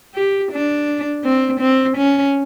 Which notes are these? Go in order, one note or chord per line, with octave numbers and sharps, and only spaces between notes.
G4
D4
C4
C4
C#4